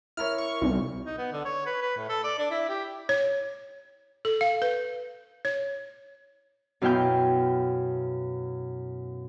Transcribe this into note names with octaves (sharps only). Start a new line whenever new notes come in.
E4 A#4 C#5 F6
C#6
C2
D#4
B3
D3
C#5
B4
B4
A2
A4
D5
D4
E4
G4
C#5
A4
F5
B4
C#5
F#2 B2 E4 F5 G5 G6